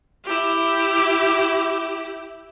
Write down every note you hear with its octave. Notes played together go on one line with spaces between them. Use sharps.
E4 G4